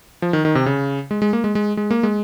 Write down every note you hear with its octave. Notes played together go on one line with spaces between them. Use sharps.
F3
D#3
D#3
C3
C#3
G#3
G#3
A#3
G#3
G#3
G#3
A#3
G#3